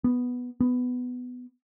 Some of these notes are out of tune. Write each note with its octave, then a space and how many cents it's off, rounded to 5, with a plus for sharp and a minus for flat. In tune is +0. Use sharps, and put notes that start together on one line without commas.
B3 +0
B3 +10